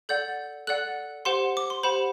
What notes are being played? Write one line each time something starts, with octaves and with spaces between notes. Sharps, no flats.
A4 D5 F#5 G6
A4 D5 F#5 F#6
G4 C5 F#5 C6
D6
C6
G4 C5 F#5 B5